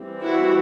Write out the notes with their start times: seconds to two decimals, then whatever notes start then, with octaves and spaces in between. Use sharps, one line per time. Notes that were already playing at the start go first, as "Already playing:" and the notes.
Already playing: E3 G3 C4
0.23 E4 F#4